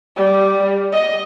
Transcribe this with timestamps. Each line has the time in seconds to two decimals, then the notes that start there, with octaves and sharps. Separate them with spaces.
0.17 G3
0.93 D#5